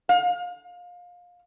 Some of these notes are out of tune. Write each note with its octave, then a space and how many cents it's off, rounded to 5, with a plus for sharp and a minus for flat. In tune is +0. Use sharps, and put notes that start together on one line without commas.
F5 +25